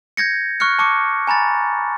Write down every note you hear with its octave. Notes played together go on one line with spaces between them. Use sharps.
G6 G#6 A#6 C#7
C#6 F6 F#6 C#7
A5 C#6 D6 C#7
G#5 A#5 B5 A6